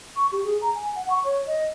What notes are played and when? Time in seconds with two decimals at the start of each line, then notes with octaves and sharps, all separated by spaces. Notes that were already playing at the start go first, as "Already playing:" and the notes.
0.16 C#6
0.32 G4
0.44 G#4
0.62 A#5
0.75 G#5
0.95 F#5
1.10 C#6
1.24 C#5
1.47 D#5